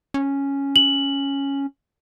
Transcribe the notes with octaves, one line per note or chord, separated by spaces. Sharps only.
C#4
F#7